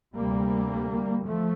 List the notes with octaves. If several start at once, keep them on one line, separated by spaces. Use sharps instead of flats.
D2 C3 G3 A#3
F3 A3